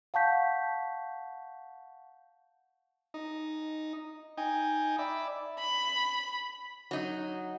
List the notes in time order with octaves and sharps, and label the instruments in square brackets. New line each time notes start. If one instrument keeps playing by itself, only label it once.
[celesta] F5 F#5 A5 C#6 G6 B6
[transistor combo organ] D#4
D#4 G5 G#5
D5 E5 B5
[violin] B5
[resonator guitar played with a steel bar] F#3 D#4